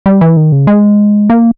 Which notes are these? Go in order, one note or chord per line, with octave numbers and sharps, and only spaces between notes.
G3
E3
D#3
C#3
G#3
A#3